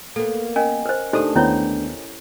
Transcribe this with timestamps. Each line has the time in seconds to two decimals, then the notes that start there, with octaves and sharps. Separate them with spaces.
0.16 A#3 B3 A4
0.56 C#4 A#4 D#5 G#5
0.86 B4 C5
1.13 D2 D4 D#4 G4 A4 C5 D#6
1.36 D#2 B3 C#4 E4 C#5 G6